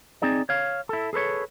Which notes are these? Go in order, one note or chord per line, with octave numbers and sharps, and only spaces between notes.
C4 D#4 G#4 D5
C#5 F5
E4 A4
G#4 A4 B4 C#5